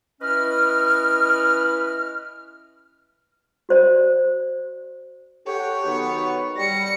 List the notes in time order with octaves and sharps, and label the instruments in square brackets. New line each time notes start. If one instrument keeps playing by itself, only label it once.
[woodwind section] C#4 E4 B4 D#5 F6
[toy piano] F#4 C5 D5
[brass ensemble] G4 A4 F#5 [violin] C#5
[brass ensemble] D#3 F#3 B3
[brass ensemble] G3 [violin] A#6 C#7